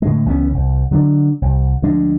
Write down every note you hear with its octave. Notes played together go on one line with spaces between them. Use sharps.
A2 D3 G#3
C#2 E3 B3 C#4
C2
D3 F#3 A#3 D4
C2
D2 F3 G#3 D4